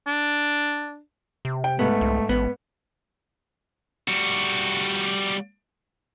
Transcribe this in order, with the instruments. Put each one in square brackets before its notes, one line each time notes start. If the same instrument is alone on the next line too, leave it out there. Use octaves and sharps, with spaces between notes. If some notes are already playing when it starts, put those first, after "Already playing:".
[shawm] D4
[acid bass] C3
[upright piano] G5
[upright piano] G#2 [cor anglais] A3 [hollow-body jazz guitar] B3
[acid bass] C2
[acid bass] A1 [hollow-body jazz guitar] B3
[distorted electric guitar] G3 F#4